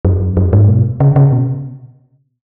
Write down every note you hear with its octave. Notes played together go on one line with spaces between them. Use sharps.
F#2
F#2
G#2
B2
C#3
C#3
B2